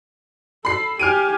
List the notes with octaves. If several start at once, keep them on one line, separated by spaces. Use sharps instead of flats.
A4 B5 C7
G4 G#5 F6 D7 D#7